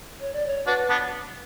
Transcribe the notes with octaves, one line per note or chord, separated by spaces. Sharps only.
C#5
D5
C#5
D4 F#4 B4
B3 D4